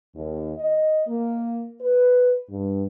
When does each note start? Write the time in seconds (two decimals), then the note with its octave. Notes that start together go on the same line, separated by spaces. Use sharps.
0.15 D#2
0.58 D#5
1.08 A#3
1.81 B4
2.50 G2